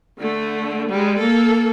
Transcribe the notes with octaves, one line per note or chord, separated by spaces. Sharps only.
D3 A3
G3 G#3
A#3 A4